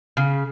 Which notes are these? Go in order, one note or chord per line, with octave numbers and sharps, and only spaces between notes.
C#3